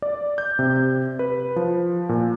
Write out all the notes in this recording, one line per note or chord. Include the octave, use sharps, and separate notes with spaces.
D5
G6
C3
B4
F3
A#2